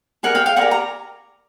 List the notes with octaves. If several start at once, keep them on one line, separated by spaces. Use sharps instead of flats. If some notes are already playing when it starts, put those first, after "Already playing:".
G4 A#4 D5 F#5 G#5
F5 G5
F5 G5
G4 A#4 D5 F#5 G#5
A#5